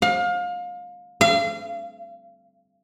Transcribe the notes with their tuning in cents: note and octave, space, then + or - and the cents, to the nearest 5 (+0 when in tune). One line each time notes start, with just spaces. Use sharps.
F5 +30
F5 -35